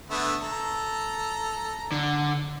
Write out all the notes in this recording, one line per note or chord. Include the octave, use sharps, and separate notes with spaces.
D3 A3 B3
A4 A#5
D3